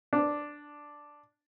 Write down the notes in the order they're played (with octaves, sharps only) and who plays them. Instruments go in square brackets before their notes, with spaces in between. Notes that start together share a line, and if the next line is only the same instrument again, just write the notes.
[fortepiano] D4